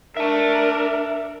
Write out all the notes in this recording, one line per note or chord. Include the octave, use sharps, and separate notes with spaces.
D4 A#4 E5 A5